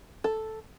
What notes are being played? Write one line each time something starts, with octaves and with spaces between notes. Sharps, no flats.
A4